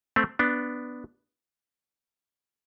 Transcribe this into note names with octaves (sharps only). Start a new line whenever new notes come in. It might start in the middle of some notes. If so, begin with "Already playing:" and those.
A3 C4
B3 D4